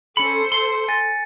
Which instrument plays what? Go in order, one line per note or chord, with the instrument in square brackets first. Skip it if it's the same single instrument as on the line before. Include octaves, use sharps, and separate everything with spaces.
[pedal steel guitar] C#4 B5 [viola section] A4 C5 [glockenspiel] C#7
[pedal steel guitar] C6
[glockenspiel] G#5 A6 A#6